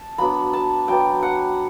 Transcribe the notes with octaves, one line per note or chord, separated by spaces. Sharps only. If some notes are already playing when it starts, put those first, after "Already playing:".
Already playing: A5
F#3 B3 D4 B5
A5
F#3 B3 D4 G5
F#5